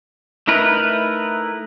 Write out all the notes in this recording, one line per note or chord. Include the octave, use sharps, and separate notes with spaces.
A3 D#4 E4 A#4 B4